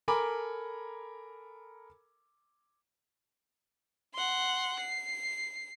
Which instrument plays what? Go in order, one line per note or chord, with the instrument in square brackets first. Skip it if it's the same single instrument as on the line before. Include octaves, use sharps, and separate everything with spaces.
[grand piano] A4 A#4 G#5 A#5 B5 D6
[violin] F#5 C6
C7